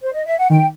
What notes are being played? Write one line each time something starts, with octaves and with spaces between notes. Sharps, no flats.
C5
D#5
E5
F#5
D#3 G5